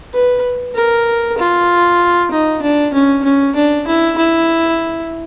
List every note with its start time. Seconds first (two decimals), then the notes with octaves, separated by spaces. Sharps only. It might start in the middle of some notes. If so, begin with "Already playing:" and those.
0.13 B4
0.74 A#4
1.38 F4
2.31 D#4
2.62 D4
2.93 C#4
3.24 C#4
3.55 D4
3.87 E4
4.18 E4